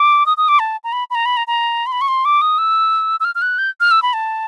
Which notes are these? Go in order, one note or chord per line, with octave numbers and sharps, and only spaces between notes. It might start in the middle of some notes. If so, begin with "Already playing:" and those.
Already playing: D6
D#6
D#6
D6
A5
A#5
B5
B5
A#5
B5
A#5
A#5
C6
B5
C#6
C6
D6
D#6
E6
E6
F6
F6
F#6
G6
F6
E6
B5
A5